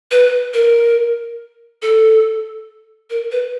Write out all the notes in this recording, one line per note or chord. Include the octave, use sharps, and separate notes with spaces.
B4
A#4
A4
A#4
B4